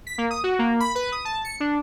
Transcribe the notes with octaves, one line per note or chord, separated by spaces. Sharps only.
B6
A#3
D#6
F#4
A#3
B5
B4
D#6
A5
C#7
D4